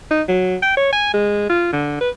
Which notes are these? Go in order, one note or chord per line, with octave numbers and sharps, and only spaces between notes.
D#4
F#3
G5
C#5
G#5
G#3
F4
D3
B4